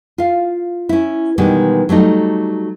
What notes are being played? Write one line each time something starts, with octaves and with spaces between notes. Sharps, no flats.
F4 F5
C#4 E4
B2 D#3 E3 G3 G#3
F#3 G3 A3 D#4